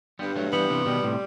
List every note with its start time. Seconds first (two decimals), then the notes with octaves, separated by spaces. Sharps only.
0.18 G2 G3 B3
0.36 F#3 A3
0.53 E3 G3 B3
0.70 C3 E3
0.85 B2 D#3 G3
1.03 A2 C3